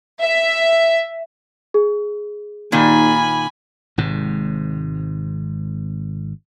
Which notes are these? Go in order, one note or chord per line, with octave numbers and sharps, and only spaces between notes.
E5
G#4
D#2 A#2 D#3 G#5 B5
G#1 G#2 C3